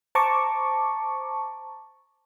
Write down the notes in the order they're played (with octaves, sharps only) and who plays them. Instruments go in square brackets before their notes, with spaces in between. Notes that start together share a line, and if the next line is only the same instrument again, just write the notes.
[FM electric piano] C5 A5 A#5 C#6 D6